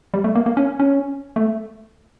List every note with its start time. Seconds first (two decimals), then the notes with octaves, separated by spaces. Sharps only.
0.14 G3
0.24 A3
0.35 A#3
0.46 A#3
0.57 C#4
0.79 C#4
1.36 A3